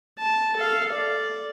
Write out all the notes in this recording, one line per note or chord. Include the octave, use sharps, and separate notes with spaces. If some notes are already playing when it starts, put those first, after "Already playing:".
A5
A4 F5
D5